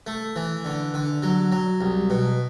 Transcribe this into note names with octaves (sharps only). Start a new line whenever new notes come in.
A3
E3
D3
D3
F#3
F#3
C2
B2